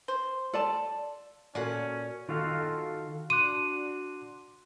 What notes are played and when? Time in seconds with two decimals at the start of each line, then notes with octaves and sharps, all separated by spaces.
0.08 C5
0.53 F4 A4 D5 A5
1.55 A#2 C#4 F#4 A4 D5 F#5
2.29 D#3 F4 F#4 A4 F5
3.30 D4 F#4 C6 D6 F#6 D#7